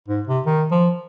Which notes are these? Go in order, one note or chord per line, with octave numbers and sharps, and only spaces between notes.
G#2
C3
D#3
F3